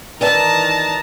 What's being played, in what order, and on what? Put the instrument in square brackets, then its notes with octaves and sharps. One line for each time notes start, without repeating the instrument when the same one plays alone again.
[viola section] D#3 E3 A#5 [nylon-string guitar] B4 D5 E5 [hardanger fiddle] A5